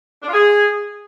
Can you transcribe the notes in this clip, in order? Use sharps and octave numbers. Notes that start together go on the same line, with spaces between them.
D4
F4
G#4